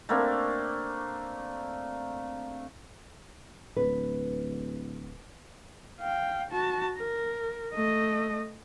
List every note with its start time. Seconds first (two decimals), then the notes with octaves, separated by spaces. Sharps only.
0.09 A3 A#3 C4 D4
3.77 D1 B4
6.00 F5 G5
6.51 F#4 A5
6.98 A#4
7.73 A3 D#5